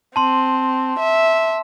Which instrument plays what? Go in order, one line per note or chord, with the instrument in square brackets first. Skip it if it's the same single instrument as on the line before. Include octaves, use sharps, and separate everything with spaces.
[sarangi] C4 [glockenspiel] A5 C6
[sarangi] E5